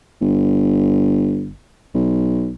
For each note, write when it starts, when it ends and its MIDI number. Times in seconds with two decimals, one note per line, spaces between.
0.21 1.52 31
1.94 2.53 35